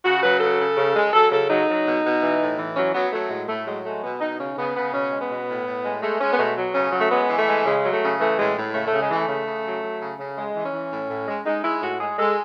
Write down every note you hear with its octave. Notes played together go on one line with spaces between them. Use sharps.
C#3 F#4
F#3 B4
C#3 A4
C#3
C#3
G#3
F#3 A4
C#3 A4
F#3 D#4
F#3
B2
B2
E3
A2
E3
F#3 C#4
F#3 B3
F#3 A3
A2 G#3
A2 A3
F#3 G#3
G#3 A3
B2 B3
B2 D#4
C#3 C#4
C#3 B3
C#3 B3
B2 C#4
G#3
B3
B2
A2
A2
G#3
G#3 A3
G#3 C#4
B3
B2 A3
F#3
C#3 C#4
F#3
A3
G#3 B3
E3
A3
G#3
C#3 G#3
F#3
A3
C#3
E3 A3
A2 G#3
A2
C#3 A3
A3
C#3
G#3
E3 A3
C#3
C#3
F#3
F#3
C#3
C#3
G#3
E3
C#4
E3
A2
A2
G#3
G#3 D#4
G#3 E4
A2 F#4
G#3 G#4
G#3 A4